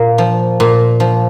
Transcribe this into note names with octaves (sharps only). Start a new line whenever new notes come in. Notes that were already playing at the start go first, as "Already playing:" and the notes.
Already playing: A#2 A#3
F3
A#2
F3